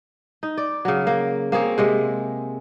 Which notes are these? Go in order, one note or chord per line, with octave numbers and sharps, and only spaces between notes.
D#4
D5
C#3 F#3
A#3
A#3 C4 G#4 C#5
C3 G#3